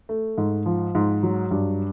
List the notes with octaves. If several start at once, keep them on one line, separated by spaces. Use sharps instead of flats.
A3
G#2
F3
G#2
F#3
G2